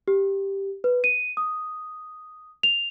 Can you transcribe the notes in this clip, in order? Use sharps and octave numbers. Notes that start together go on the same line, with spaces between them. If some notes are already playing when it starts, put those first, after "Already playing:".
G4
B4
D#7
D#6
F7